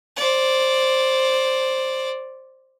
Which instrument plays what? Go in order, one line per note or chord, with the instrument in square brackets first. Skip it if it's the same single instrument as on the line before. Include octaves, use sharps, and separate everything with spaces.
[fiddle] C5 D5